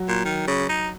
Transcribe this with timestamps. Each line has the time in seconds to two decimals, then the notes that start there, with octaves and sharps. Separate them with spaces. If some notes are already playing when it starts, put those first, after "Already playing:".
Already playing: F#3
0.08 A#2
0.25 D#3
0.47 C#3
0.69 D#4